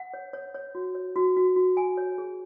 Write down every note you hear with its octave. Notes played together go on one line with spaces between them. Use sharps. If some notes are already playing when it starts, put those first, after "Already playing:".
Already playing: F#5
C#5
C#5
C#5
F#4
C#5
F#4
F#4
F#4
G#5
C#5
G#4